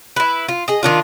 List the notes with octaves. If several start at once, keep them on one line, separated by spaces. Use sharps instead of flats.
E4 B4
F4
G#4 D#5
D#3 D4 F4